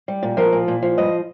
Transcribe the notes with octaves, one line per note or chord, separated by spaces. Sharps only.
G3
A#2
F3 A#4
A#2
A#2
F3
G2 D#5